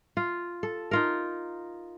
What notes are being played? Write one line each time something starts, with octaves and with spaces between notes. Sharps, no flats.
F4
A4
D#4 F4 A#4